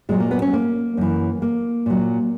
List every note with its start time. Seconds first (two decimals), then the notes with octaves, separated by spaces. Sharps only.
0.09 A#2 F#3 G#3
0.20 A#3
0.31 B3
0.42 C#4
0.53 A#3
0.97 F#2 E3
1.42 A#3
1.86 A#2 F#3